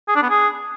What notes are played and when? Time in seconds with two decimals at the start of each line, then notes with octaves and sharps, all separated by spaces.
0.08 G#4
0.15 D4
0.23 B3
0.30 G#4